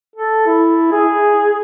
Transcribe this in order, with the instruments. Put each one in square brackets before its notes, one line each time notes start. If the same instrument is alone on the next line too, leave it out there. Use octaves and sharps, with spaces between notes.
[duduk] A4
E4
G#4